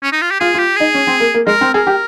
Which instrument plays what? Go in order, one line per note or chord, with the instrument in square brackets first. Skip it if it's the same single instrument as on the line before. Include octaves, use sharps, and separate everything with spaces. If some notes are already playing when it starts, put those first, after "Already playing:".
[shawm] C#4
D#4
F4
G4
[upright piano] F4 [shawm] G#4
[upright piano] F4
[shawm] G4
[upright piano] D#4 [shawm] G#4
[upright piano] C#4
C4
A#3
A#3
[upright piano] G#3 [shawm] A#4
[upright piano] C4
[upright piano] G#4 [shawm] A#4
[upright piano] G4